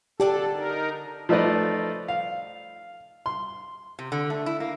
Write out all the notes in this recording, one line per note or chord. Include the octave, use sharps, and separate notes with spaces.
D3 G4 A4 D5 A5
D#4 A#4
F3 A3 D#4 B4 D5 D#5
F5
C6
C3
D3
A3
E4
A#3